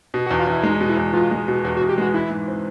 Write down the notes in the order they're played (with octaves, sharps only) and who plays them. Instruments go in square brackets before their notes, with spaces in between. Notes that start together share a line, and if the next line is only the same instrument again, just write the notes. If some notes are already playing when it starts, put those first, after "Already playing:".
[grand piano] B2
[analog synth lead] F#4
[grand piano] E2
[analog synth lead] F4
[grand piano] E2 [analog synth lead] E4
[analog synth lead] E4
[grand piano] G#3 [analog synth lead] D#4
[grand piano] B2
[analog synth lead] E4
[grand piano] E2
[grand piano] E2 [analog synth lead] F4
[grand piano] G#3
B2
[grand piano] E2 [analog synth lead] F#4
[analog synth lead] F#4
[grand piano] E2
[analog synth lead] G4
[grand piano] G#3 [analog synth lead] F#4
[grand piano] E3 [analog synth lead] E4
[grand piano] G#2
C4